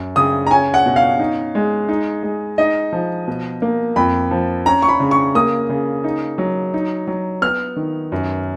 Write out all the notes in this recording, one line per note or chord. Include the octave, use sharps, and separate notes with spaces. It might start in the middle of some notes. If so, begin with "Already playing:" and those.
Already playing: F#2
C#3 D#6
A#5
C#4 G#5
F#5
B2
F5
D#4
G#3
D#4
G#3
D#4 D#5
F3
B2
A#3
F2 B5
F3
C#4 A#5
C#6
B5
C#3
C#6
A#3 D#6
C#3
D#4
F#3
D#4
F#3
B3 F6
D#3
F#2